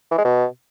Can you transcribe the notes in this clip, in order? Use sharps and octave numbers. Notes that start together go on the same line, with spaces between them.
E3
G#3
B2